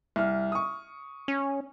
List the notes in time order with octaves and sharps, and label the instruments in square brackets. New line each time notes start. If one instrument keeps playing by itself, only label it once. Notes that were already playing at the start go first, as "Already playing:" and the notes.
[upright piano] C2 F6
C#6 D#6
[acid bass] C#4